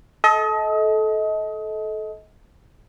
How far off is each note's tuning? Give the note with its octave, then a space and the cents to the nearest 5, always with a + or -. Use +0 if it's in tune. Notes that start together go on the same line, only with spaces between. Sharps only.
A4 -20 D#5 +30